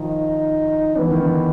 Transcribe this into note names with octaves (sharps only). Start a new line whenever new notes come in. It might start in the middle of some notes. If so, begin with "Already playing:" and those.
Already playing: D#3 F3 D#4
E3 B3
D#3
D3 E3